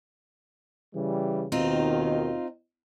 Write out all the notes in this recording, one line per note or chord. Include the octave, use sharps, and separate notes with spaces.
C#3 E3 G3
D#2 B2 D#3 C4 D#4 F4